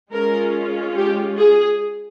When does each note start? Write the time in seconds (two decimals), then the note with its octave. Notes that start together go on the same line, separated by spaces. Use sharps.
0.12 G#3 C#4 F4 A#4
0.96 G4
1.38 G#4